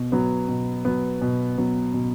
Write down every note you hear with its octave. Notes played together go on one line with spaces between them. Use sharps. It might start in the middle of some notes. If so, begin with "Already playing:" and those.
Already playing: B2
F#3 B3
B2
F#3 B3
B2
F#3 B3
B2